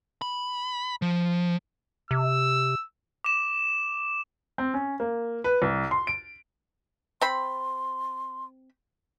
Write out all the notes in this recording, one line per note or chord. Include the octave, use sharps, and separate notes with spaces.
B5
F3
C3 E6
D6 E7
C4
C#4
A#3
B4
C2
C6
D7
C4 B5 C6